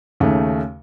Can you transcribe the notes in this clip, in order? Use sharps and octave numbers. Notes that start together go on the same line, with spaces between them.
D#2 C#3 A3